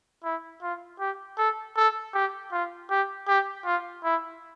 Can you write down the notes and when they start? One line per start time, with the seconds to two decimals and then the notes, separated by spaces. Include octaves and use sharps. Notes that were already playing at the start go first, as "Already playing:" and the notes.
0.24 E4
0.62 F4
1.00 G4
1.38 A4
1.77 A4
2.14 G4
2.52 F4
2.90 G4
3.28 G4
3.65 F4
4.04 E4